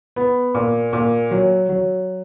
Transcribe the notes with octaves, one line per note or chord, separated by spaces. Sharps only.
B3
A#2
A#2
F#3
F#3